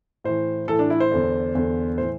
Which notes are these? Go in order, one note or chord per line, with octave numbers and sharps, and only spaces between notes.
A2 E3 C5
A2 E3 A4
D4
E4
C5
E2 D3
E2 D3
A2 E3 C5